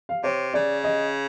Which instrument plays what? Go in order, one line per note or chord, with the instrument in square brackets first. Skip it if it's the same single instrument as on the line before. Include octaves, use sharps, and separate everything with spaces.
[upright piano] F5
[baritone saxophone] C3 [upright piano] C#5
[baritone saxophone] C#3 [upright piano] D5
[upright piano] D#5